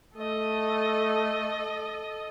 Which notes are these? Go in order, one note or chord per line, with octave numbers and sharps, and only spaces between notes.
A3 A4 D#5